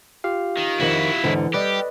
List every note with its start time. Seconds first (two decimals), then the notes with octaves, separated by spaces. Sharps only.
0.24 F4 G4 F5
0.57 D#3
0.79 F2 D#3 E4 F#4
1.24 E2 G#2 D3 E3
1.54 G3 G4 B4 D5 D#5